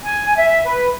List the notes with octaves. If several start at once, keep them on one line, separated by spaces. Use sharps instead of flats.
G#5
E5
B4